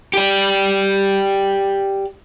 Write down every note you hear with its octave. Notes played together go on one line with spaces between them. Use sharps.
G4 D5